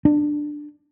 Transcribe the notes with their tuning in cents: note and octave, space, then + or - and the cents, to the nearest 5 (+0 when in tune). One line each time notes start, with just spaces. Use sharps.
D4 +10